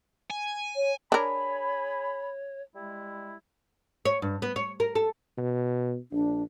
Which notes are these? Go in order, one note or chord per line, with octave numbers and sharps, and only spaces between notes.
G#5
C#5
D4 G#4 A#4 C#5 G#5 B5
G3 G#3 E4
C#5
G2
B3
C#5
A#4
A4
B2
A#1 D4